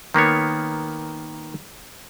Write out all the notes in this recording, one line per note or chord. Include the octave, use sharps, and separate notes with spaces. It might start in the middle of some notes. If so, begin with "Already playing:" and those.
D#3 A#3 B3 C#5